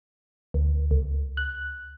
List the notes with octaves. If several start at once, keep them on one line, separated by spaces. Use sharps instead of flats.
D2
C#2
F#6